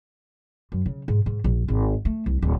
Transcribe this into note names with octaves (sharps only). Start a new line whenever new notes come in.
F#2
C#3
G#2
G#2
A#1
G#1
A3
C2
D1